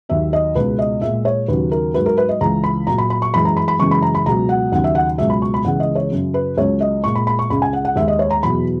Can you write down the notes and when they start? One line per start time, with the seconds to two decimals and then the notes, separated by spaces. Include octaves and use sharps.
0.09 D#2 D#3 F#3 E5
0.33 D#5
0.55 C#2 B2 G#3 B4
0.79 D#5
1.02 A#2 G#3 E5
1.25 C#5
1.48 D#2 C#3 F#3 B4
1.72 A#4
1.94 G#2 F#3 B4
2.06 A#4
2.18 B4
2.29 D#5
2.41 C#2 C#3 E3 A#5
2.64 B5
2.87 A#2 F#3 A#5
2.98 B5
3.10 B5
3.22 C#6
3.33 F#2 E3 G#3 B5
3.45 A#5
3.57 B5
3.68 B5
3.79 F#2 C#3 E3 G#3 C#6
3.91 B5
4.02 A#5
4.15 B5
4.26 C#2 B2 F#3 A#5
4.49 F#5
4.72 D#2 C#3 F#3 F#5
4.84 E5
4.95 F#5
5.18 C#2 B2 F#3 E5
5.30 B5
5.42 C#6
5.54 B5
5.65 C#2 C#3 E3 G#3 F#5
5.80 D#5
5.95 C#5
6.11 F#2 C#3 F#3
6.34 B4
6.57 C#2 C#3 F#3 C#5
6.81 D#5
7.04 A#2 G#3 C#6
7.15 B5
7.27 B5
7.39 C#6
7.50 C#2 C#3 G#3 B5
7.62 G#5
7.73 F#5
7.85 F#5
7.96 D#2 D#3 G#3 E5
8.08 D#5
8.19 C#5
8.31 A#5
8.43 E2 B2 F#3 B5